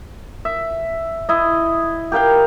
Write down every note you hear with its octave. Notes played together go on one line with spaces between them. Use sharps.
E5
E4 D#5
G4 A#4 F5 G5